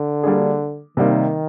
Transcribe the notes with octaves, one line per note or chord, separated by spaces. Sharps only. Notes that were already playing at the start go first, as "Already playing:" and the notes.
Already playing: D3
G3 A#3 D4 G#4
C3 D#3 G3 A#3 D#4